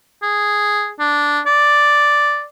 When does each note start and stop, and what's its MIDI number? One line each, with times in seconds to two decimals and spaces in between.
0.22 0.90 68
0.99 1.40 62
1.46 2.44 74